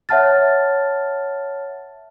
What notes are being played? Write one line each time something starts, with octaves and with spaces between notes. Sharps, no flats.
C#5 E5 F#5 A5 F6 A6